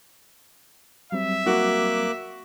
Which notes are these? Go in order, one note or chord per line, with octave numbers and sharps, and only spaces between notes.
F#3 G3 C4 E5
A#3 F#4 D6 F#6